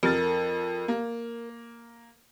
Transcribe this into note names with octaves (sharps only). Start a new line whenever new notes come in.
F2 A#4 A6
A#3